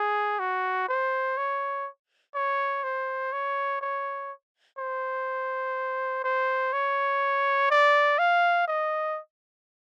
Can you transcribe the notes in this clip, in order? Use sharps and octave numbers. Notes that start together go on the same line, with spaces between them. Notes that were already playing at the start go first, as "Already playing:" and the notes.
Already playing: G#4
F#4
C5
C#5
C#5
C5
C#5
C#5
C5
C5
C#5
D5
F5
D#5